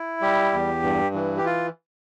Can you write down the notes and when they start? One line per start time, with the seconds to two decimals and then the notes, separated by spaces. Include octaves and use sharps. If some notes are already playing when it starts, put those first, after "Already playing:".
Already playing: E4
0.21 G3 G4
0.52 E2
0.83 G2
1.14 E3
1.37 G4
1.45 F4